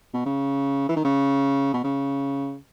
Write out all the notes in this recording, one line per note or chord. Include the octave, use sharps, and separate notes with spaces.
B2
C#3
E3
D#3
C#3
B2
C#3